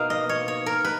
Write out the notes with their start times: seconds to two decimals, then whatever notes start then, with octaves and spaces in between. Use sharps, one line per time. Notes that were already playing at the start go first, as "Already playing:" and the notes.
Already playing: B2 A#3 D#4 F5
0.10 D#5
0.29 C#5
0.48 C#5
0.66 A#4
0.84 B4